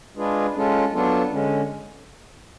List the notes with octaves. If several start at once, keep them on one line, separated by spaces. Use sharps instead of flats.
G#3 D4 F4 G#4 B4
G#3 C#4 F4 A4
F#3 B3 D4 F4 A4
D3 G#3 C#4